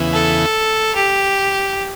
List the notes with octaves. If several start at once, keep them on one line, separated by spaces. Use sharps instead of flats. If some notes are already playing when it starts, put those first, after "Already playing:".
Already playing: E2 C#3 E3 B3 E4
A4
G4